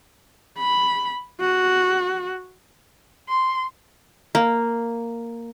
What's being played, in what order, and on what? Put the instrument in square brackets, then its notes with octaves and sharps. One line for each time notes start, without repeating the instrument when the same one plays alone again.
[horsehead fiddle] B5
F#4
[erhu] C6
[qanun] A#3